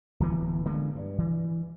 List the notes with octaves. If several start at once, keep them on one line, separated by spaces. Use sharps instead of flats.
D1 E3 B3
D3 G#3 A#3 B3
G2
E3